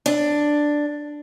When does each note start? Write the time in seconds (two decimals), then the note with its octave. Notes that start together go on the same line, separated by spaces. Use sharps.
0.06 D4